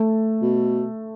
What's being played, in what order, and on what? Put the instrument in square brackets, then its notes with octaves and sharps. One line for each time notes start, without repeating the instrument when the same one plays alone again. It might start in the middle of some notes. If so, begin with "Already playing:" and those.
Already playing: [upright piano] A3
[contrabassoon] B2